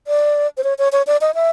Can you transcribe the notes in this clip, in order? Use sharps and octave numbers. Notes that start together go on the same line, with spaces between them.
D5
C5
C#5
C#5
C#5
D5
D#5
E5